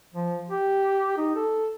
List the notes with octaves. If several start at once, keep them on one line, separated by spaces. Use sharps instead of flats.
F3
G4
D#4
A4